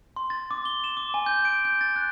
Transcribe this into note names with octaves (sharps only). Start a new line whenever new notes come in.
C6
A6
D6
G7
E7
D6
G#5
G6
D7
G6
A6
F#6